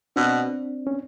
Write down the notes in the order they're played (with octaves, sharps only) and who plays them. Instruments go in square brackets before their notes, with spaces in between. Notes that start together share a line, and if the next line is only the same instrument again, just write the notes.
[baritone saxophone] B2 [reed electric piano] C4 D4
[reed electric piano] C#4